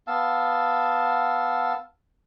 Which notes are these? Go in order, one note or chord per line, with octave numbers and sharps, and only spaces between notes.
B3 F5 A5 E6